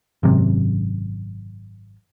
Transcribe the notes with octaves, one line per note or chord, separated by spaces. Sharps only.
G#1 F#2 C3